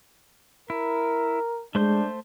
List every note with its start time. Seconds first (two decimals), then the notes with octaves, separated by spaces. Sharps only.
0.70 E4 A#4
1.75 G#3 A3 D4 C5 G6